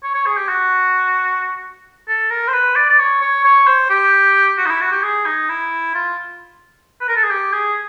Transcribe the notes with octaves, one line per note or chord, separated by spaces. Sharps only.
C#5
C#5
G#4
G4
F#4
A4
A#4
C5
B4
D5
D5
C#5
C#5
C#5
C5
G4
F#4
D#4
E4
F#4
G4
G#4
D#4
E4
F4
B4
A#4
A4
G#4
G4
G#4